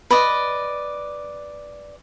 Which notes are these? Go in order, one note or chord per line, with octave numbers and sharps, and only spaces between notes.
B4 D5 D#5